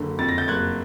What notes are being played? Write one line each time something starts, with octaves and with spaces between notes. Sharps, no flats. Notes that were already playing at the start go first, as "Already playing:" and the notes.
Already playing: F#1 D3
F2 A6
A#6
G6 A6
F#1 F#6 G#6